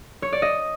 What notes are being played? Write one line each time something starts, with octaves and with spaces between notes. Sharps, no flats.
C#5
D5
D#5